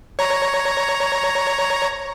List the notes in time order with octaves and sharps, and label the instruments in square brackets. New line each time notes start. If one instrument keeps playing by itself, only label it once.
[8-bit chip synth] C#5 A#5